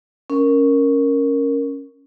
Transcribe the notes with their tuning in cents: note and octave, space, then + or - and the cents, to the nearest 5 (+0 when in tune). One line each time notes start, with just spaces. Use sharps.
C#4 +0 A#4 +0